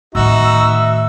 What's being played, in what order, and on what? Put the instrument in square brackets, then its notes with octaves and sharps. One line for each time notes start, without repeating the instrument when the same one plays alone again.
[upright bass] A2 D#3 [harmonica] D#4 F#4 [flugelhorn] E5 [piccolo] E6